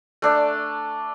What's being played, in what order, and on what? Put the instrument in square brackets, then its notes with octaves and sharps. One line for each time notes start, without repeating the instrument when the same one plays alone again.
[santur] A3 D4 D5